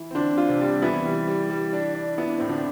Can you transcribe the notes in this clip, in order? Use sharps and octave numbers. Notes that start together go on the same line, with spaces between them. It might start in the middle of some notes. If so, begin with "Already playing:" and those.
Already playing: E3 E4
C4
D3 D4 C5
F4
C3 C4
G3
E3 B3 E4
G3
G3
G3
D4
D4
B3 E4
D4
A2 C4
D3 D4